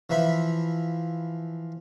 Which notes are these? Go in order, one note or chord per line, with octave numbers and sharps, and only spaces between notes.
E3 F3 E5 B5